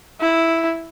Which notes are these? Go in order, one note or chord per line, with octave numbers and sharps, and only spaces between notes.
E4